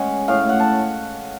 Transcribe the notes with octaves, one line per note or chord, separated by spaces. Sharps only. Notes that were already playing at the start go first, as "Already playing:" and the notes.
Already playing: G#3 C#4 F#5 G#5
A2 F5
F#5
A5